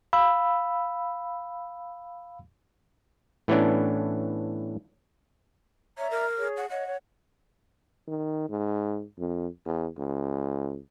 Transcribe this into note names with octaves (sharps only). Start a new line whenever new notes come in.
F5 B5 E6
A2 E3 B3 C#4 D4
C#5 D5 E5 A#5
A#4
G#4 C#5
F#5
C#5 D#5 F#5
C#5
D#3
G#2
F2
E2
C#2